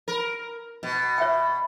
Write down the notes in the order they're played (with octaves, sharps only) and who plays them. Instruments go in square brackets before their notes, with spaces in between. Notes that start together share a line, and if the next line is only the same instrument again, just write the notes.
[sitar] A#4
B2
[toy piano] C#5 E5 G5